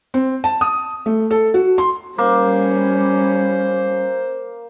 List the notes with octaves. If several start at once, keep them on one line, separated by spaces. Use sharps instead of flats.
C4
A5
D#6
A3
A4
F#4
C6
G3 A#3 C#4 C5